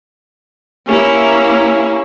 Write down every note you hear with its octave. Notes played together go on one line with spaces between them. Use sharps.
A#3 C#4 E4 G4 G#5 C#6